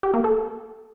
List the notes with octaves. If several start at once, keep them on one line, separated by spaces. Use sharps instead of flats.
G4
A#3
A4